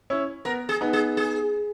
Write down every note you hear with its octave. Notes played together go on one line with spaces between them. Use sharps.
C#4 E4
B3 A#4
G#4
B3 D#4
G#4
G#4